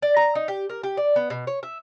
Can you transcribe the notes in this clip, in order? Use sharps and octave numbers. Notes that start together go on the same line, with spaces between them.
D5
A#5
D#4
G4
A#4
G4
D5
B3
B2
C#5
E5